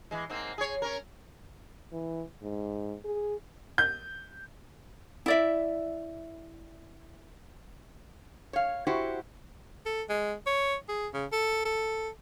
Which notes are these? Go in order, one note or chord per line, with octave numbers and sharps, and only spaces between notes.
E3 G#3
G#2 A#3 C4
G#4 C#5
C#4 A#4
E3
G#2
G#4
G6
E4 D5 E5
C#5 F5
E4 F#4 G4 C5 E5 F#5
A4
G#3
C#5
G#4
C#3
A4
A4